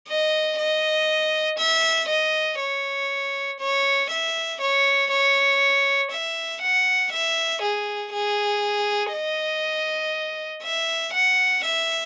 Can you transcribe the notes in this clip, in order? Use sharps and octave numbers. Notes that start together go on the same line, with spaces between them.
D#5
D#5
E5
D#5
C#5
C#5
E5
C#5
C#5
E5
F#5
E5
G#4
G#4
D#5
E5
F#5
E5